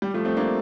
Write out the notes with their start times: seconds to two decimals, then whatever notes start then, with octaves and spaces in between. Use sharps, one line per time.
0.02 G3
0.14 F3 A3
0.25 A3 C4
0.36 A#3 D4